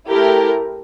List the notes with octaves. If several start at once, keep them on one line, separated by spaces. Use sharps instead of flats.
A3 E4 G4 A#4